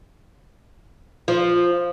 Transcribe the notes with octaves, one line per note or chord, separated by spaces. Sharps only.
F3